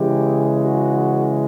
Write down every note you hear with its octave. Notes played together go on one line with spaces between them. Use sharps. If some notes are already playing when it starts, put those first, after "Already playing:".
Already playing: C#3 E3 G#3 G4
F#4